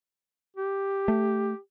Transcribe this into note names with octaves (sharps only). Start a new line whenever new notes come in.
G4
A3